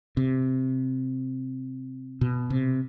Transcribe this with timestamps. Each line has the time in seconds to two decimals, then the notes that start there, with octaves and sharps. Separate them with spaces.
0.17 C3
2.21 B2
2.50 C3